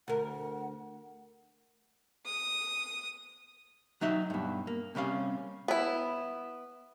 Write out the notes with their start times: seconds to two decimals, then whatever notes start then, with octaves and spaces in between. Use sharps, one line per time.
0.08 D2 A#4 F#5
2.26 D#6
4.01 F#3 D#4 E5
4.30 G2 B2
4.67 A#3
4.95 C3 G3 C#4 F5
5.68 B3 E4